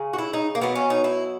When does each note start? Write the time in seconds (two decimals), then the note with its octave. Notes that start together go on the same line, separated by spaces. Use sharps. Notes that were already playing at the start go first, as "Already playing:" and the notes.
Already playing: C#3 G#3
0.13 F#4
0.18 E4
0.33 D#4
0.55 A#3
0.61 B2 F#3 B3
0.75 C#4
0.90 D#4
1.04 E4